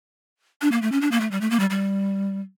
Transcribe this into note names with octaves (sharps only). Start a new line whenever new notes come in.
D4
A#3
A3
C#4
D4
A#3
A3
G3
A3
A#3
G3
G3